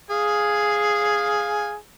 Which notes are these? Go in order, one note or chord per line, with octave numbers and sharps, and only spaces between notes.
G#4 F5 G#5